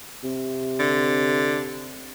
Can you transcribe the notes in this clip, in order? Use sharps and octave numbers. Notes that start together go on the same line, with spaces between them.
C3
D3